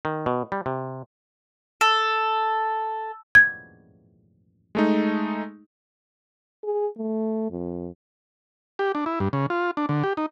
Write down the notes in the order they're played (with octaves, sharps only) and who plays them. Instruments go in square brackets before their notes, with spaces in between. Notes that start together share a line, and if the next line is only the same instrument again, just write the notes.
[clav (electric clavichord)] D#3
B2
G3
C3
[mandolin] A4
[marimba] G#6
[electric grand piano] G#3 A3 D#4
[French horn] G#4
A3
F2
[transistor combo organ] G4
D4
E4
G2
C#3
F4
D4
D3
G4
D#4